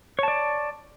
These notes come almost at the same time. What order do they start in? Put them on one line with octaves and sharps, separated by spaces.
C#5 A5 D5